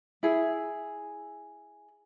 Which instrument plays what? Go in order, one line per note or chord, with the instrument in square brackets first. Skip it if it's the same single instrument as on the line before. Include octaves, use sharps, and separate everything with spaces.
[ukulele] E4 G#4